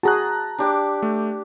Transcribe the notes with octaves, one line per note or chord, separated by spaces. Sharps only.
F#4 G#4 A5 A#5 F#6
D4 G4 D6
A3